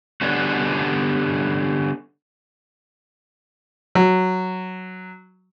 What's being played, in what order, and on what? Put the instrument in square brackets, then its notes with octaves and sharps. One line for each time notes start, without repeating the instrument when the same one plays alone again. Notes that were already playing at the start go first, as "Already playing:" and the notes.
[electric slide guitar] D3 G3 B3 C#4 D4 F#4
[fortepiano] F#3